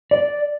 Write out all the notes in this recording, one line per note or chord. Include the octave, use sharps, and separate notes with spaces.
D5